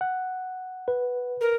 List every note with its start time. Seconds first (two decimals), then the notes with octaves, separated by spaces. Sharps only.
0.01 F#5
0.88 B4
1.41 A#4